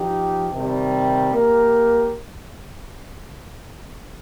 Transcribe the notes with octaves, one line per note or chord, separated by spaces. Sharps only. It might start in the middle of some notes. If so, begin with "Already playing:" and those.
Already playing: F3 D#4 G4
C3 D#3 G3
A#3 G4 A#4